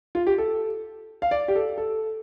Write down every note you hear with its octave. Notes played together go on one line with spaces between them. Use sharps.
F4
G4
A4
F5
D5
G4
A4
A4